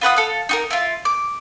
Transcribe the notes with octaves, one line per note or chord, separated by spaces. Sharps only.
F4 B4 F#5 D#6
A4 F5
D#4 F#4 A#4
E4 F4
D6